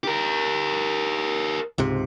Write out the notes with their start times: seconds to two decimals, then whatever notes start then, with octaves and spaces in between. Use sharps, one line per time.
0.04 G4 A#4
1.78 C#2 G#2 C3